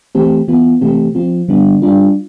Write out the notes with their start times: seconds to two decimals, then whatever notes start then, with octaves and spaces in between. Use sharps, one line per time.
0.15 E3 A3 C4 G4
0.48 E3 B3 F4
0.81 C3 E3 A3 C4 G4
1.15 F3 C4 F4
1.48 D3 G3 B3 D4
1.82 G3 D4 F4